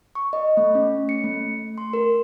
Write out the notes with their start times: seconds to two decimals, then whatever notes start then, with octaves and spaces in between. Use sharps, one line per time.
0.15 C#6
0.33 D#5
0.57 A3
0.75 C#4
1.09 C#7
1.24 A3
1.78 C6
1.93 A#4